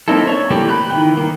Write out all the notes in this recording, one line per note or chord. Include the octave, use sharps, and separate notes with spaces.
A#3 C4 D#4 E4 A4
D4 C#5 E5
E3 A3 A#3 G4 D5
B5 F#6 G6
D#3 E3 G5
D#3 A#3